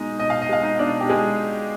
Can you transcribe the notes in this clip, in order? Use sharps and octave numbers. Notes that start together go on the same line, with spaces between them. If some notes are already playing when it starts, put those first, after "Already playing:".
Already playing: B2 G#3 D#4 D#5
B2 D#5
F5
D#5
G#3 F5
D#4 D#5
B2 D4 D5
G4
G#3 G#4